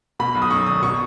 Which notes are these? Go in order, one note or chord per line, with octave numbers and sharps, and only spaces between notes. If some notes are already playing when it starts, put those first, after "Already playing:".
B2 B5
B1
D#6
F#2 C#6
G#1 D#6
B2 C#6